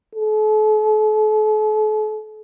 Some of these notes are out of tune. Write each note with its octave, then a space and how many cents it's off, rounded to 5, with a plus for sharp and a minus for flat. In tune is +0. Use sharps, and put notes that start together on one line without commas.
A4 -40